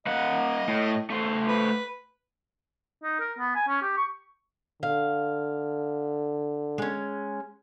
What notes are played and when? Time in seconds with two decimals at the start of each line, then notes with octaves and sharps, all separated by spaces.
0.07 A#3 D#5 F#5
0.68 A2
1.10 A3 C5
1.47 B4
3.03 D#4
3.20 A#4
3.39 B3
3.55 G#5
3.68 C#4
3.82 G4
3.97 C#6
4.83 D3 F5
6.78 G#3 C#4